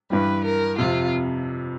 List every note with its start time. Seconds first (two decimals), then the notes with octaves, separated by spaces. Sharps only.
0.10 G2 E3 G3 B4
0.45 A#4
0.78 F2 C3 F3 F4